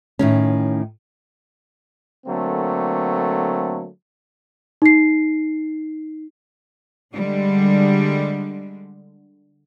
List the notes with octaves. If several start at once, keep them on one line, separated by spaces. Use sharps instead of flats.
A2 D#3 C#4
D3 F#3 A3 A#3 C4
D#4 C7
D3 G3 G#3